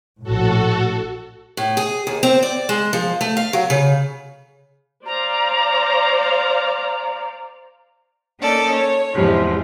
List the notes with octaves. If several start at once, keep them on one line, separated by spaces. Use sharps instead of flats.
A#1 A2 F#4 A4
A2
G#4
D#2
C4
D5
G#3
F3
A3
F5
F#3
C#3
C5 D5 F5 A#5
A#3 C#4 D#4 A4 D5
C#5
E2 G#2 C3 F3